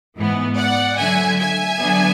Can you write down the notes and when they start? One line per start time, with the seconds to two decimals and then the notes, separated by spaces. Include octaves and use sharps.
0.17 G#2 E3 B3
0.57 D5 F#5
0.98 D3 F#3 A3 E5 G#5
1.39 E5 G#5
1.80 D3 F#3 B3 D4